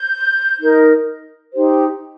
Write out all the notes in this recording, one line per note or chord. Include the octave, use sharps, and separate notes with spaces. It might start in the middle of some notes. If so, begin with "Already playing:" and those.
Already playing: G6
D#4 A#4
D#4 G4 C5